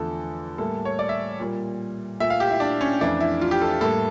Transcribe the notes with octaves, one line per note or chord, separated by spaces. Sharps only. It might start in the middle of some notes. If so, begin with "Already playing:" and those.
Already playing: E2 D3 F3 A3 A4
A2 G3 A#3 A4
C#5
D5
E5
A#2 G3 A#3
A#2 A3 E5
F5
G4
E4
D4
C#4
F2 E3 A3 D4
E4
F4
G4
A4
A2 G3 A#3 A4